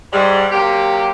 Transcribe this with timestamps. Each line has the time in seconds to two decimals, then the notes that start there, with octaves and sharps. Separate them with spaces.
0.12 G#2 G3
0.51 C3 F#3 A#3 G4